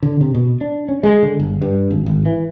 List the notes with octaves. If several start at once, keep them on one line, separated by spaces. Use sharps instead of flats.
D3
C3
B2
D4
C#4
G#3
D3
G1
G2
G#1
G#1
E3